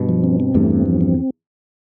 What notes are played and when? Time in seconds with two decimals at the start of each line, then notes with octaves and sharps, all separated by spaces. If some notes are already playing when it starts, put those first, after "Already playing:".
Already playing: G2 B2
0.09 F3
0.24 C4
0.40 C4
0.55 E2 G2 A3
0.71 C4
0.86 F3
1.01 C4